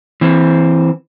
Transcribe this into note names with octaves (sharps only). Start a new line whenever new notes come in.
E3 C4